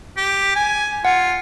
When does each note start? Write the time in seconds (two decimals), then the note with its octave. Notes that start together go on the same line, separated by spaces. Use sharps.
0.17 G4
0.55 G#5
1.05 F4 F#5